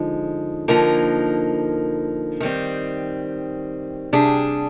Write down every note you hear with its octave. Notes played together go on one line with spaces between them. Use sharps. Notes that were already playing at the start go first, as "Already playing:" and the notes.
Already playing: D3 F3 G#3 D#4
D3 F3 A#3 D#4 A#4
D#3 G3 C4
C3 G3 D4 G#4